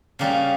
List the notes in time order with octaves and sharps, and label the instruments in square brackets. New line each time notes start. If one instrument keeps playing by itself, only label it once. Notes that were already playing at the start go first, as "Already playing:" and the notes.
[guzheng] C#3 G3 A#3 C#4 G4